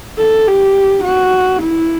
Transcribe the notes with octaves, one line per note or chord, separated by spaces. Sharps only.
A4
G4
F#4
E4